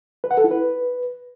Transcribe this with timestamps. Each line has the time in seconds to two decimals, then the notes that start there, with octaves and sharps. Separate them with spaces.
0.24 B4
0.31 F#5
0.37 A4
0.44 E4
0.51 B4